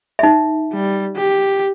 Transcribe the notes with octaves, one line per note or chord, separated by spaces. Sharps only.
D#4 E5
G3
G4